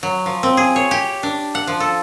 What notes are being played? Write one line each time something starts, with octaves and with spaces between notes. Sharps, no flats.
F#3
F3
C4
G#4
C#5
G4
D4
F#5
F3
A4